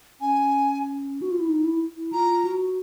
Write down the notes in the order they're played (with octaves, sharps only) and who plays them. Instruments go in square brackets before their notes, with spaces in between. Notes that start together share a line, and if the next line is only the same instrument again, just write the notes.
[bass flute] C#4 [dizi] G#5
[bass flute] F#4
F4
E4
D#4
E4
E4
[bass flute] F4 [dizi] A#5
[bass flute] F#4